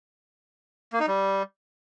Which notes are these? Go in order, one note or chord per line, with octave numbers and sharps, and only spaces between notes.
A#3
D#4
G3